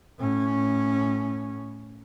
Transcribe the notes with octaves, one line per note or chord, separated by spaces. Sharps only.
A2 C#4